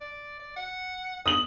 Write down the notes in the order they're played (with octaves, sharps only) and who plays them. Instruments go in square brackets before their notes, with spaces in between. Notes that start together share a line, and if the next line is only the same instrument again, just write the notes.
[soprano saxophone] D5
D5
F#5
[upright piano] D#6 F#7